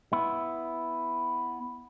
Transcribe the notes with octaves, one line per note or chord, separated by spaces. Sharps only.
B3 E4